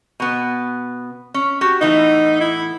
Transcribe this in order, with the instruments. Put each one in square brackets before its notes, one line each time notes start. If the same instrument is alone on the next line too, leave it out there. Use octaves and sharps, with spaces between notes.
[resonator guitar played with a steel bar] B2 B3
C#4
F#4 G4
[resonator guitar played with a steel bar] A2 E3 B3 [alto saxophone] D#4
[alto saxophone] E4